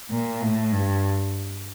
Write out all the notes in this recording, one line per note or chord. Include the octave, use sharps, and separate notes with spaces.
A#2
A2
G2